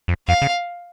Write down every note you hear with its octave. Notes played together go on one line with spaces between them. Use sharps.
F2
F2 F5
C#3